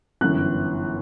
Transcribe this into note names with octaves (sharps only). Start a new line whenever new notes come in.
G1 F#2 E3 F#6